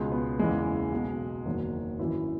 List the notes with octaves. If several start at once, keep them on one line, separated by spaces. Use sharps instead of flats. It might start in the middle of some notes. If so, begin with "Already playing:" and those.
Already playing: C#2 B2 G#3
B3
F#1 E2 C#3 E3 G#3
B1 B2
F#1 E2 D#3 F#3
G#1 F#2 E3 E4